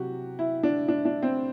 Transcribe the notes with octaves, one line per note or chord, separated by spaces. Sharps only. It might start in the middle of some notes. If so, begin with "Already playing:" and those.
Already playing: C3 F#3 F#4 G4
E4
D4
D4
D4
C4